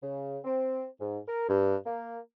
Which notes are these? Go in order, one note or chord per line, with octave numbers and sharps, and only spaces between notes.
C#3
C4
G#2
A#4
G2
A#3